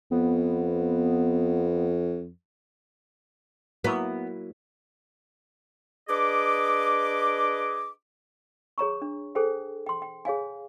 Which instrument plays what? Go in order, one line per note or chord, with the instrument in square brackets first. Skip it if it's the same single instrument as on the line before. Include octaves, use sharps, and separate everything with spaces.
[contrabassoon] F2 [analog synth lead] B3
[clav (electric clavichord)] F#3 A#3 E4 [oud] B3
[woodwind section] D4 G#4 B4 D#5 D6
[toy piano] G#4 C#5 A#5 C#6
D4
G#4 A4 C5 G5 G#5
G5 C6
G5
G#4 C#5 F5 G#5